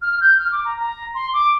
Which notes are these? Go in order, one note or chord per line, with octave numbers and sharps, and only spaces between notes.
F6
G6
F6
D6
A#5
A#5
C6
D6